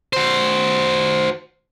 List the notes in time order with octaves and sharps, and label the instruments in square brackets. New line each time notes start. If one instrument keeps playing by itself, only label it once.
[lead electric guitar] F#4 C5